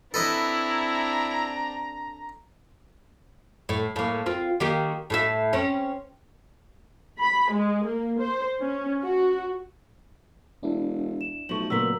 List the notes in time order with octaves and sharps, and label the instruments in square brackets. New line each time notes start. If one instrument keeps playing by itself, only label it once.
[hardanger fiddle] C4 D4 [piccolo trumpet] E4 [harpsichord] A4 B4 D#5 [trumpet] A#5
[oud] A2
A2 A#3
C4 F4
D#3 A#3 G4
A2 G#4 E5
C4 C#4
[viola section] B5
G#3
A#3
C5
C#4
F#4
[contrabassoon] E1 [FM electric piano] D4 E4
[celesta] E7
[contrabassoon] B1 [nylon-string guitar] F3 A3 [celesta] C#6 F#7
[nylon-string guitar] A#2 A#4 [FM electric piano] C#3 F#3 B3 [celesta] E6 B6 F#7